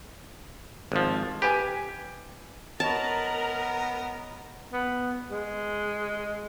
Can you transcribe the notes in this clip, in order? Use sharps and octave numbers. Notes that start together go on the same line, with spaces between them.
G#1 F3
G4 B4 G#5
B3 A#4 C#5 D#5 A5 A#5 C#6
B3
G#3